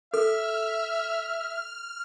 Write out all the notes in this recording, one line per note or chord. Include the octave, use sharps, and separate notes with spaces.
A4 E5 F6